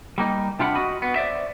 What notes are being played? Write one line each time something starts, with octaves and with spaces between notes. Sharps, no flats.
G3 A#3 D#4
C3 D4 F4 G4 F#5 B5
F#4 D#5 B5
B3
C5 D5 E5